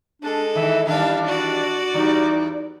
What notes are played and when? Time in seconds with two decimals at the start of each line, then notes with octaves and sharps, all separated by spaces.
0.22 G#3 D4 A4
0.55 D#3 E3 E5
0.87 D#3 E3 G3 D4 F5 A5
1.26 F#4 D5
1.94 E2 G3 D#4